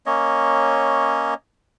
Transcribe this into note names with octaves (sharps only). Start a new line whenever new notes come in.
A#3 C#4 C#5 D#5